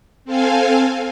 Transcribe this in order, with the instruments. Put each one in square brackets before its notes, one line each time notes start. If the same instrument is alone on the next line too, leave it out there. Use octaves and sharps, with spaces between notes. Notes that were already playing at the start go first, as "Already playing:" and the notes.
[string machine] C4 A4 F5 G#5